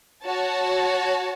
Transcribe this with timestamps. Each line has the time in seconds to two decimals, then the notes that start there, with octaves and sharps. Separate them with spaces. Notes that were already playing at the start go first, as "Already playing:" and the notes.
0.24 F#4 C#5 A5